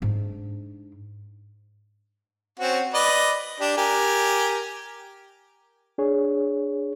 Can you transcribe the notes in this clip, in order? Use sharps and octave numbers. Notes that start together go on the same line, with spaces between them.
G#2 D4
C4 C#4 F#4
B4 D5 D#5
D4 G4
G4 A#4 G#5
D4 G#4 C#5